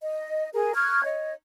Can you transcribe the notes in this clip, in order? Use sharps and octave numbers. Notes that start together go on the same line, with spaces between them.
D#5
G#4 A#4
C#6 F6 F#6 G#6
C#5 D#5